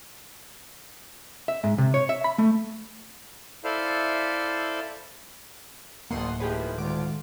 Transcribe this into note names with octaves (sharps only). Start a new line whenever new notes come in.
E5
G#2
C3
C#5
E5
B5
A3
E4 A4 C5 D5 E5 F5
D1 A1 D#2 A3 A#3 F#5 C6 D#6
A2 D#3 F3 G4 G#4 B4
D2 D#3 G#3 A3 F4 F#5 D6